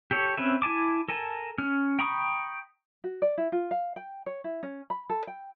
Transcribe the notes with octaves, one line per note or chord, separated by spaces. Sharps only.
G4 A4 C#5
C4 C#4 B4 E5
E4 G#5 A5 D6
A4 A#4 G#5 A5
C#4 F6
G5 A#5 B5 C#6 D#6
F#4
D5
E4
F4
F5
G5
C#5
E4
C#4
B5
A4
G5